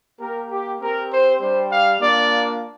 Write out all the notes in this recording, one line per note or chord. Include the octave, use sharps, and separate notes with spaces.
A#3 G4 A#4
G4
C4 G4 A#4
C5
G3 D4 G4 C5
F5
A#3 D4 F4 D5